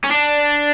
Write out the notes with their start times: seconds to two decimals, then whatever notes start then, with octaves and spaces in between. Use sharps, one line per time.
0.04 C#4
0.11 D4